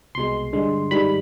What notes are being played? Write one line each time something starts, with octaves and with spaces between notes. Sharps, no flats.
C2 B2 G#3 C6
G2 D3 G#3
G#2 D#3 G3 B5